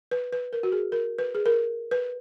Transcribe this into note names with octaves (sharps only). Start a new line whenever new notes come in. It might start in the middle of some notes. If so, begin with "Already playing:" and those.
B4
B4
A#4
F#4
G#4
A#4
B4
G#4
A#4
B4